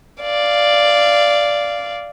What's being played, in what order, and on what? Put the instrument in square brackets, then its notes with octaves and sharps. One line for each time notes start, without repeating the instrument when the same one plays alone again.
[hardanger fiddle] D5 F5